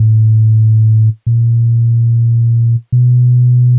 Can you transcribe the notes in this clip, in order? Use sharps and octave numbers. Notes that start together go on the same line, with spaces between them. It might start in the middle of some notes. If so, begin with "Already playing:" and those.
Already playing: A2
A#2
B2